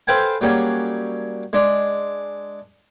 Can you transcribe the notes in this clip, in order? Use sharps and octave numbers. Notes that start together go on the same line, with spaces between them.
A4 B4 C5 F5 G5 G#5
F#3 G3 A#3 C#4 G#4
G#3 D4